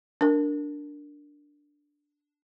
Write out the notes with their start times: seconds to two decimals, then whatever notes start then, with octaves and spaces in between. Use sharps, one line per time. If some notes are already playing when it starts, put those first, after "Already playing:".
0.21 D4 A#4